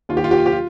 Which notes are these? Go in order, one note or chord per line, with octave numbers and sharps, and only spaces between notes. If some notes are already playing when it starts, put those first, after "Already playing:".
D#2 D#3 F4
G4
F4
G4
F4
G4
F4